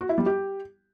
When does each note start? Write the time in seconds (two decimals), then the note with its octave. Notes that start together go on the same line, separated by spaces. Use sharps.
0.01 F#4
0.09 E4
0.18 G3
0.26 G4